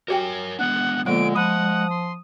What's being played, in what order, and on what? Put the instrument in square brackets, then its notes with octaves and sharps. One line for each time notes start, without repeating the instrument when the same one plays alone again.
[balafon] F#4 G4 G5 [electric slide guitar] A#4 C#5 G#5
[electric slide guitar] G#3 B3 D4 [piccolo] F#5
[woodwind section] A#2 D3 [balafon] F3 A#3 B3 [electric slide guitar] G#3 [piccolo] D7
[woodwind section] F3 D#6 [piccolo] F#5 [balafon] B5
[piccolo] C6